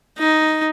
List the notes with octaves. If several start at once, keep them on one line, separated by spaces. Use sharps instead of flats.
D#4